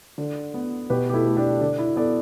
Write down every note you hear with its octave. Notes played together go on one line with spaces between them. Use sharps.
D3
B3
B2 G4 B4
G4
E4 A4
A3
D4 G4
D3 D4
E4
B3 A4 D5